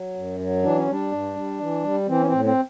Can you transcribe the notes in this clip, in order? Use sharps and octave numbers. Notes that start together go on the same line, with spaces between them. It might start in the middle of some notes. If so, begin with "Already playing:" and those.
Already playing: F#3
F#2
F#3
E3 D4
C#4
G3 D4
G2
G3
E3
G3
E3 C4
C#4
C4
A2
C4